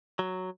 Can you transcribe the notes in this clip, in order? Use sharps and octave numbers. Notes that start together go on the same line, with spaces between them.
F#3